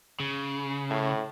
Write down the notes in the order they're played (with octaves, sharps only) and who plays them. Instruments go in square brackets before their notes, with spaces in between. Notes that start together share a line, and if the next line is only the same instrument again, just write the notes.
[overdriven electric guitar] C#3
[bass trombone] A2